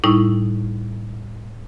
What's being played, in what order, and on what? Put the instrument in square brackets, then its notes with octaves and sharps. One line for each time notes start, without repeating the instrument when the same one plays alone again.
[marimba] A2 G3 D#4 E4 C#6